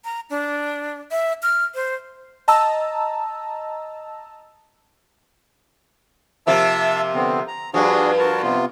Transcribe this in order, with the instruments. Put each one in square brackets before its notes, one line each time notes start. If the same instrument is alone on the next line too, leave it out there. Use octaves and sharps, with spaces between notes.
[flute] A#5
D4
E5
F6
C5
[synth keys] D#5 A5 A#5 E6
[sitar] C3 F3 A#3 [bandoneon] E5 A5 E6
[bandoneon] D3 B3 C4
A#5
[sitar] G2 F3 [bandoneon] D4 F#4 G#4
[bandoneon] F#4 A#4 A5
C3 B3 F4